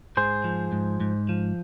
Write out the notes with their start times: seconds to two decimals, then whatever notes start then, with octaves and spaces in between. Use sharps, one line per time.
0.17 G#2 G#4 C5
0.44 F3
0.72 G#2
1.00 G#2
1.29 F3